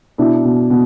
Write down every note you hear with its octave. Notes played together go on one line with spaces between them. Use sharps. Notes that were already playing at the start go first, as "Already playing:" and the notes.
B2 D4 E4
B2
B2